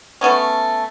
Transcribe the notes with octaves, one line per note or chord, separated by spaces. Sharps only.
A3 B3 C#4